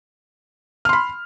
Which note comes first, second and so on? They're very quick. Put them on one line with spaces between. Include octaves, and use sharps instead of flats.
F6 C6 B5